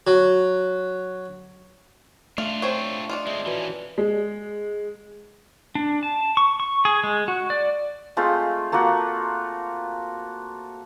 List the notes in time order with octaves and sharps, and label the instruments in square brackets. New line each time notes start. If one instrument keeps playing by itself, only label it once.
[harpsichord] F#3
[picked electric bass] A3 [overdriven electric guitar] D4 F4 [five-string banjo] F5
[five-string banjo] C4 C#5 G5 [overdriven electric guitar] D4 F4 [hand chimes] C#6
[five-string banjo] D4 D#4 F4
[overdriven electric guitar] G#3 C4 [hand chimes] D5 E5
[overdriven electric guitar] E3 C#4 [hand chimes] F#4 B4
[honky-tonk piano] G#3
[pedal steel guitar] D4
A5
C#6
C#6
G#4
G#3
F#4
D5
[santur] G#3 A3 C4 F4
A3 A#3 F4 F#4